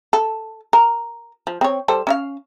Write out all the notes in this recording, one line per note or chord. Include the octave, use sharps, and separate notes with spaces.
A4
A#4
F3
C4 C#5
G3 A4 C5
C#4 E5 F5